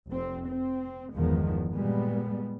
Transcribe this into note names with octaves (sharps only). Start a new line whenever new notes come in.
F1 C4
C4
G1 E2 D#3 F3 G#3
A#2 G3 G#3 B3